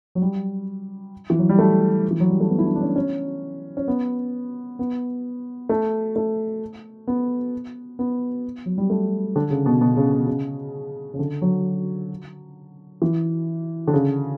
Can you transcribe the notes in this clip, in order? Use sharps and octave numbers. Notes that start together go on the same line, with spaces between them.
F#3
G3
E3
F#3
G3
A3
E3
F#3
G3
A3
B3
E4
D4
D4
C#4
C#4
C#4
B3
B3
A3
A3
B3
B3
F#3
G3
A3
D3
C#3
B2
B2
C#3
B2
C#3
C#3
D3
F#3
E3
D3
C#3